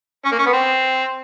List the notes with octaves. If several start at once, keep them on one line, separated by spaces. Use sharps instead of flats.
C#4
A#3
C#4
B3
C4